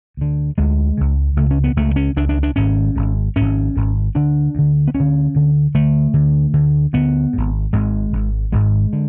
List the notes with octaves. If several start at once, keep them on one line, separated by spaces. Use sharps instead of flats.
D2 D3
D2 D3 G#3
C#2 C#3
C#2 C#3 A3
C#4
B3
C#2 C#3 A3
C#4
C#2 C#3 D4
D4
D4
G#1 G#2 C#4
G#1 G#2
G#1 G#2 C#4
G#1 G#2
D2 D3 D4
D2 D3
B3
D2 C#4
D3
D2 D3
D2 D3 A3
D2 D3
D2 D3
D2 D3 B3
G#1 G#2
G#1 G#2 G#3
G#1 G#2
G#1 G#2 G#3
D3